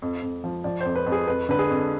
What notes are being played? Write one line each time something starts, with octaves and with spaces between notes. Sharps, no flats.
F2
F2
F3
F3 D5
F2 C5
B4
F2
G#4
F2 B4
D3 B4
G#4
F2